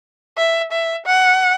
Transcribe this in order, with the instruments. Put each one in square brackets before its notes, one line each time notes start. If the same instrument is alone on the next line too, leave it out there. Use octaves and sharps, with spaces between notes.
[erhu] E5
E5
F#5